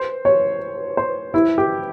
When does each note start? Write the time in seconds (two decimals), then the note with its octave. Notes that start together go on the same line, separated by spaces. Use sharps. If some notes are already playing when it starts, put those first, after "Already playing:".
Already playing: C5
0.25 C#5
0.97 C5
1.34 E4
1.58 G4